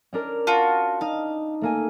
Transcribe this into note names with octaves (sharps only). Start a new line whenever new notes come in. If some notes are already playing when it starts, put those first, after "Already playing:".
C#4 D4 A#4
F4 F#4 A5
D#4 F5
A3 A#3 G#5